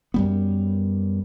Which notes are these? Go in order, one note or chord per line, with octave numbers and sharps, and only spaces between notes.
F#2 G3 B3